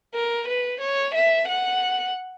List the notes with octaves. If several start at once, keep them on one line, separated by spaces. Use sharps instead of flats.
A#4
B4
C#5
E5
F#5